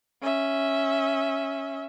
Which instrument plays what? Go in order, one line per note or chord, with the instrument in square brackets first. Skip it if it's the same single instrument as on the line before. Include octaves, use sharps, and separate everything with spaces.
[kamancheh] C#4 E5